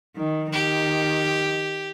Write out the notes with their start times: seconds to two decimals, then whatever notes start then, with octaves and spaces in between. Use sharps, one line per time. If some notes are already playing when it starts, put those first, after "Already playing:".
0.17 D#3
0.53 D#3 G4